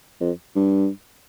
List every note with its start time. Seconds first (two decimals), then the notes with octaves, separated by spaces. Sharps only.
0.20 F2
0.56 G2